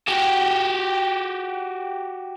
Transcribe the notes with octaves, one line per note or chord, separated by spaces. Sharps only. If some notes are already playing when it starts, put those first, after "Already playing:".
F#4 G4